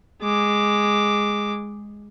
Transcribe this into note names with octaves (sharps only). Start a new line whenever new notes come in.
G#3 D6